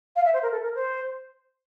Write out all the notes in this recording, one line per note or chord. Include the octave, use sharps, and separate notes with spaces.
F5
E5
C5
A#4
A4
A#4
C5